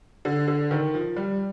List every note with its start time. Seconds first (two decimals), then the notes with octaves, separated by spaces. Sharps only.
0.25 D3
0.48 D3
0.71 D#3
0.94 F3
1.16 G3